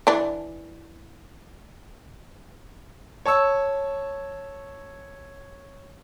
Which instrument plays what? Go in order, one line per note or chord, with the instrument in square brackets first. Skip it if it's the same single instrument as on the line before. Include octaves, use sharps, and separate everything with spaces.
[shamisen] E3 D4
[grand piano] C#5 A5 C#6 E6